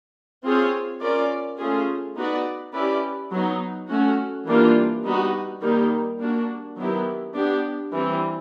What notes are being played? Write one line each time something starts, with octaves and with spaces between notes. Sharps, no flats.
C4 F4 G#4 C#5
C#4 F4 A#4 D5
A3 C#4 F4 G#4
B3 D#4 F#4 B4 D5
C#4 E4 G4 B4 D5
F#3 B3 D#4
A3 C#4 F#4
E3 G3 A#3 D4 F4
G3 B3 D#4 F#4 B4
D#3 G3 A#3 D#4
A#3 D4 F#4
D#3 F#3 B3 E4 G4
B3 D4 G4
E3 G3 C4